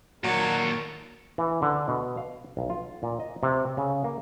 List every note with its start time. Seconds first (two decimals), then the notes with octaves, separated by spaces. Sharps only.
0.24 A#2 D#3 F#3 A#4 C#5 A5
1.38 E3
1.62 D3
1.88 B2
2.17 F5
2.57 B1
2.70 F4
3.03 A#2
3.20 D#5
3.43 C3
3.77 C#3
4.04 A#3